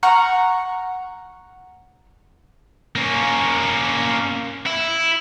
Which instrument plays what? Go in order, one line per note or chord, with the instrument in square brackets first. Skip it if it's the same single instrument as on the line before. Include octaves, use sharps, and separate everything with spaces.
[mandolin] F#5 A#5 C#6 F6
[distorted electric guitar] A#3 C#4
E4